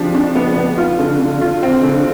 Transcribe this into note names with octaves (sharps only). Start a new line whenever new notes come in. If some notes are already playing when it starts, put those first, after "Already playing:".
Already playing: F3 D4 G4
D4
B3
B3
F4
D3
D3
F4
C4
D3